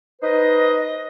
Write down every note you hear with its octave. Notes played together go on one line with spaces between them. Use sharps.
D#4 B4 C5 D#5